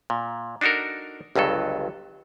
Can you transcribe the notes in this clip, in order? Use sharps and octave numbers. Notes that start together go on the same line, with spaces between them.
A#2
D4 D#4 F#4 A4 A#4
G1 C#2 G2 F#3 A4